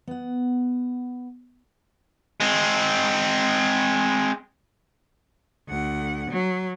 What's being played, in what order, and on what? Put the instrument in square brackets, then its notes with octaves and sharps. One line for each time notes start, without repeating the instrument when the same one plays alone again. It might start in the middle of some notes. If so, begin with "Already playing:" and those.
[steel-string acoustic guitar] B3 F#5
[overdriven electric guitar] G#3 C4
[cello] D2 F#5
F#3